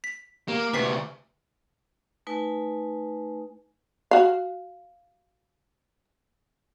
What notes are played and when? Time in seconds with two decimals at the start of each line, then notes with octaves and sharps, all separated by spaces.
0.04 B6
0.48 A#3 G4
0.73 D2 C3 B4 B6 C7
2.27 A3 D#4 B4 G#5
4.11 F#4 F5